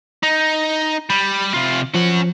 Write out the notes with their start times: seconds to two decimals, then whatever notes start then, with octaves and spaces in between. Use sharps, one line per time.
0.23 D#4
1.10 G3 B5
1.54 C3 F4
1.95 F3 C#4 F#5